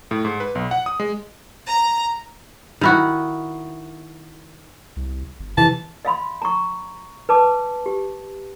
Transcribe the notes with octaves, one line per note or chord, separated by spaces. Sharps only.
A2
G#2
B4
B1
F#5
D#6
G#3
A#5
D#3 E4 F#4
C2
G1
C3 E3 A5
D#5 F5 B5 C6
A#5 C#6
B4 A5 D6
G4